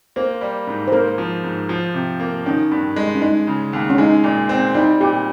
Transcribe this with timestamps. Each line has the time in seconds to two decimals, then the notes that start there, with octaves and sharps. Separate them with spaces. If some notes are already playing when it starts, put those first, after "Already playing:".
0.16 A#3 C5
0.41 G3
0.67 G#2
0.88 C5
0.92 A#3 A#4
1.18 F3
1.44 G#2
1.69 F3
1.94 C3
2.20 A#3
2.46 D#3 C#4
2.71 G2
2.96 G#3
3.15 C#4
3.22 G#3 D#4
3.47 C#3
3.73 D#2
3.90 C#4
3.98 G#3 D#4
4.24 A#2
4.49 C4
4.74 G3 D#4
5.01 A#2 G4